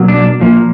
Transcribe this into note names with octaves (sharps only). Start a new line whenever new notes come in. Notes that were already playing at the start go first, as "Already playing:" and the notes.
Already playing: B2 F#3 A#3
D4
A#2 F3 A#3